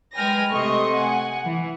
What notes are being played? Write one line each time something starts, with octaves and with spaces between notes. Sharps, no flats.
G#3 B4 G5 G#5 F6 A#6
C3 A3 D#5 C6 C#6
F#5 G#5
E3